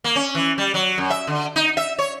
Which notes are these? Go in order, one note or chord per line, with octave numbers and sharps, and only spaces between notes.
A#3
C#4
E3
G3
F#3
F#2
E5
D3
D#4
E5
C#5